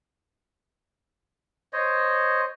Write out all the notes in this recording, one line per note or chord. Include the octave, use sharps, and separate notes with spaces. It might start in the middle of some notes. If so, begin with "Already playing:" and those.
C5 C#5 D#5